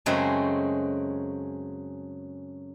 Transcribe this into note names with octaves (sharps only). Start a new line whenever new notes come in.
F#2 C#3 G#3 A3 C4 F#4